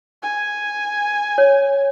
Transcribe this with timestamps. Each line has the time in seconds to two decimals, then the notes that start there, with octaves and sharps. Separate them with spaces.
0.22 G#5
1.38 C#5